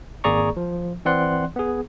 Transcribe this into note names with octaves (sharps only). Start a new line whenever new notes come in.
G#1 A#3 G#4 D5 A#5 C#6
F3
E3 C4 D5 F#5 C6 F#6
B3 G#4